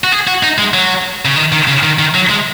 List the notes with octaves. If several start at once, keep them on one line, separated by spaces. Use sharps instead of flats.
F#4
G#4
F#4
D#4
G#3
F#3
C#3
D#3
D#3
C#3
D#3
D#3
F#3
G#3